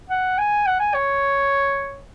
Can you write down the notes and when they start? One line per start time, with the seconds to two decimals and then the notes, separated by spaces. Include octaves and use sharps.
0.10 F#5
0.38 G#5
0.66 F#5
0.80 G#5
0.94 C#5